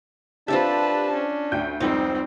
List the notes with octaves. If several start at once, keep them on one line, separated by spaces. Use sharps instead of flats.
C4 D4 F4 G4 A4 B4 E5 A5
C#4
D2 G5 G6
F1 C#2 G3 C4 D#4 C5